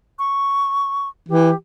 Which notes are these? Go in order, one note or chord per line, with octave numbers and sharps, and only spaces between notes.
C#6
E3 G4